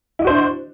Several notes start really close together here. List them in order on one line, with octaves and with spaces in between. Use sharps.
E4 D#5 F#4 C5 D4